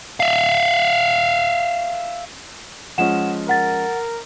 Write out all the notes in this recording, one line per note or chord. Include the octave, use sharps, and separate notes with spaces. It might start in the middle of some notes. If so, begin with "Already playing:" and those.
E5 F5
F3 G#3 C#4 F#5 E7
A#4 F#5 A6